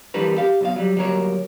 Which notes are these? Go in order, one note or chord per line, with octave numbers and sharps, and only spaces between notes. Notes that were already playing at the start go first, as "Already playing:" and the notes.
D3 E3 G3 D4 A#4 B4
G4 F5
B1 B2 F5
F#3 G3
D2 F#3 G3 A#3 A#4 C#5